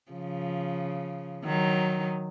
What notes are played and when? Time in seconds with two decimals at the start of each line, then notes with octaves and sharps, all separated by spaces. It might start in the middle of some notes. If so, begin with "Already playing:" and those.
0.12 C#3 F3
1.45 D#3 F#3